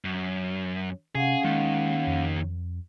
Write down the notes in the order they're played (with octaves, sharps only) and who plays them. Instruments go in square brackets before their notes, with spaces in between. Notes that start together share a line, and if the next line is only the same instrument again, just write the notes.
[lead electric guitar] F#2
[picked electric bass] C3 [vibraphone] C#4 F5 F#5 [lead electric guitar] G#4
[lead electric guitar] D#2 D#3 [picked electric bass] G#3
[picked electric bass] F2